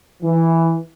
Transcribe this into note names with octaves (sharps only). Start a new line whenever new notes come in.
E3